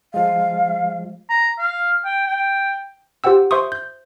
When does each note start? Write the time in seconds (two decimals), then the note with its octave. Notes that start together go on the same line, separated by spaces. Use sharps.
0.14 F3 G#3 F5
1.29 A#5
1.59 F5
2.04 G5
2.27 G5
3.24 F4 G4 C5 F#5 G5 E6
3.51 C5 E5 C6 C#6 D#6
3.72 G6